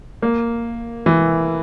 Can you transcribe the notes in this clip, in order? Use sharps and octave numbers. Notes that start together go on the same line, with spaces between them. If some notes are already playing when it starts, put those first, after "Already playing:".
A#3
E3